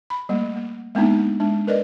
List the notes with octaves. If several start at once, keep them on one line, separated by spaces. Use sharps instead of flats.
B5
G3 A3 A#3
A#3
G#3 A#3 B3 D4 D#4
G#3 D4
A#4 B4 D5 D#5